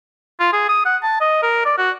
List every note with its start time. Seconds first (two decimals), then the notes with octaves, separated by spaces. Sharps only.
0.40 F4
0.53 G#4
0.69 D#6
0.86 F#5
1.03 A5
1.21 D#5
1.43 A#4
1.65 D5
1.78 F#4